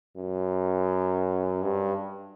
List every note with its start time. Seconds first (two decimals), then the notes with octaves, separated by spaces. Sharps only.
0.16 F#2
1.63 G2